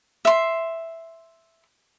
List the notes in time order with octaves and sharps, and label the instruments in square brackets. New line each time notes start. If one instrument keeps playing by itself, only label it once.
[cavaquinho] E5 C6